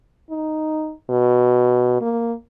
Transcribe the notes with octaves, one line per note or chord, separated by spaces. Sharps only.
D#4
B2
A#3